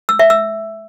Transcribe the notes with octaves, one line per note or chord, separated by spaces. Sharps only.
E6
E5
E6